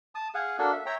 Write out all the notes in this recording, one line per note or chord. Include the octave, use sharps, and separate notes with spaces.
A5 D#6
G#4 F5 F#5
A#3 D4 F#4 A4
E5
C#5 E5 G5 A#5